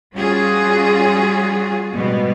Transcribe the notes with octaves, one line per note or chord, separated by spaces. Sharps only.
G3 C#4 F4 F#4 G#4
G#2 B2 G3 B3